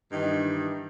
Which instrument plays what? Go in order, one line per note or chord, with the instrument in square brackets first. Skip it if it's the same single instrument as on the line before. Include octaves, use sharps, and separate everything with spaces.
[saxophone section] G2 D#3 E3 D#4